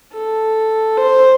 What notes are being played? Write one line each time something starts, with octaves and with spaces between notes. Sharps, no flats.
A4
C5